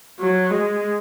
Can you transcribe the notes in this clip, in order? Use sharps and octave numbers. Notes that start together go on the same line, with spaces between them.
F#3
G#3